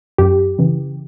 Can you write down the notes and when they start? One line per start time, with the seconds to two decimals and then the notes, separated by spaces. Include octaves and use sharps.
0.18 F#2 G4
0.58 C#3 E3